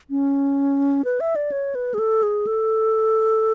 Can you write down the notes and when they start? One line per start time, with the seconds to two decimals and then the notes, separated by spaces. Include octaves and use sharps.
0.10 C#4
1.05 B4
1.20 E5
1.36 D5
1.52 C#5
1.75 B4
1.94 G#4
1.99 A4
2.23 G#4
2.47 A4